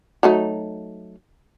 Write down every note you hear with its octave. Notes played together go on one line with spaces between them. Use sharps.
F#3 A3 D#4